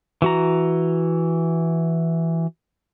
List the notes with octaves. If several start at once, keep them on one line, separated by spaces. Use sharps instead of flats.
E3 F#4 A#5